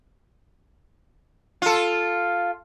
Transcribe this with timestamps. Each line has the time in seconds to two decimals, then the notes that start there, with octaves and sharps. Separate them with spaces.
1.62 F4 A4